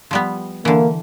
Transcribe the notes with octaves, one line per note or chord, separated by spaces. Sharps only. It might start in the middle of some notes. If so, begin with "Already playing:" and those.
F3 G3 B3
D3 E3 A#3